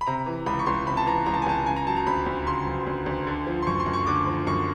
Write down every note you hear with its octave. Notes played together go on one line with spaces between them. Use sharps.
B5
C3 A#5
E3
C#2 B5
C#6
C#2 C6
C3 B5
A5
E3 A#5
C#2 A#5
A5
G#5
C#2 A5
C#3 G#5
A#5
F#3 A5
A#5
D2 B5
D2
C#3 C6
F#3
D2
D2
D3
F3
C6
F#2 C#6
C6
F#2
C#6
D3 D6
F3
F#2 C#6